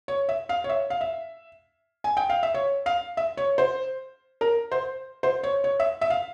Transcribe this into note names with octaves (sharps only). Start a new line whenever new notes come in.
C#5
E5
F5
C#5
E5
F5
E5
G#5
G5
F5
E5
C#5
F5
E5
C#5
C5
A#4
C5
C5
C#5
C#5
E5
E5
F5